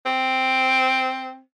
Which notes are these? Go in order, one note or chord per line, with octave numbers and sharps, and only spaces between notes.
C4